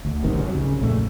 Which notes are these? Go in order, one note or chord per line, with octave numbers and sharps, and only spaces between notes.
D2
G#1 F#2 C3 D#3
C2 F#3
C#3
B1 F2 A#2 A3